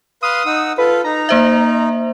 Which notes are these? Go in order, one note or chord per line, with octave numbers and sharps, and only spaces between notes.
B4 F5 C6 D#6
D#4 F#5 E6
F4 A4 B4
D#4 A#5
A#3 C5 E5